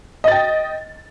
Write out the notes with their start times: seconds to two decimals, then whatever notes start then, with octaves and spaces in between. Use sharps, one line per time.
0.24 D#5
0.28 A6
0.32 G5